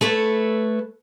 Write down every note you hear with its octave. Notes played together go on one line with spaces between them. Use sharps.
A3 A4 B4 C#5